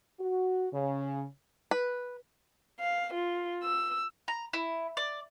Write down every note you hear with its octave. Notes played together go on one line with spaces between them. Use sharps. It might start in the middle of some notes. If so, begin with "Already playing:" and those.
F#4
C#3
B4
F5
F4
E6
A#5
E4
D5